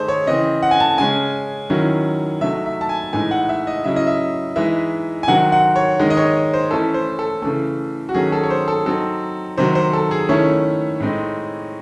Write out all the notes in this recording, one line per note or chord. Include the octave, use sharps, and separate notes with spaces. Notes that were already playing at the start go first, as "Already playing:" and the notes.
Already playing: D#3 A3 D#4 G#4 A4 C5
C#5
C#3 E3 C4 D#5
F#5
G#5
A5
C#3 G#3 C#4 G#5
D#3 F#3 C#4 E4
C3 F#3 A3 D#4 E5
E5
A5
G#5
A2 E3 G#3 D#4 G#5
F#5
E5
D#5
C#3 F#3 C#4 E4 E5
D#5
E5
E3 G#3 D#4 E5
G#5
C3 D#3 F#3 C4 F#5
F#5
C#5
D#3 G#3 D#4
D#5
C#5
C5
E3 A3 C#4 E4 A4
C5
A4
C#3 E3 A3 A4
F#4
D#3 F#3 A3 C#4 G#4
A4
C#5
C5
A4
F#3 C4 D#4 A4
C3 D#3 F#3 C5
C5
A4
G#4
D#3 A3 C#4 E4 C#5
A2 G#3 C4 D#4